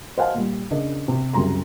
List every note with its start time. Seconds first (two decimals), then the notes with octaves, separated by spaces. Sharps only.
0.18 C5 D#5 F5 F#5 G#5 A5
0.34 A#2 G3
0.71 C#3 D4 A#4 D#5
1.08 C3
1.33 C2 F#2 C#3 A#5 C6